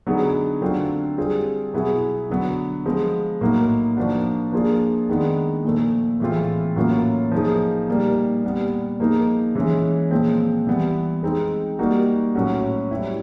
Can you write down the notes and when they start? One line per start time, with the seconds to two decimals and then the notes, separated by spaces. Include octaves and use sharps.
0.07 D3 F#3 B3 D#4 G#4
0.61 D3 F#3 A3 C4 F4
1.17 G3 C4 F4 G#4
1.74 B2 F#3 B3 E4 G#4
2.30 D3 F#3 B3
2.86 F3 G#3 B3
3.41 A2 F#3 A#3 D#4
3.97 F3 A#3 D4 F#4
4.52 F3 A#3 D4 F4 G#4
5.09 D#3 G#3 B3 D4
5.64 A#2 F3 A3
6.20 A2 E3 G#3 C4 F4
6.76 A2 F#3 A#3 C#4 F4
7.32 F3 A#3 D#4 G#4
7.88 A#2 G3 A#3 D#4
8.44 A#2 G3 B3
9.00 F3 A#3 D#4 G#4
9.55 E3 G#3 C#4
10.11 A#2 F3 G#3 C4
10.67 E3 G3 B3
11.23 G#3 C4 D#4
11.79 G3 A#3 D#4 F#4
12.35 A2 F#3 A3 C#4 F#4
12.91 G3 C4 E4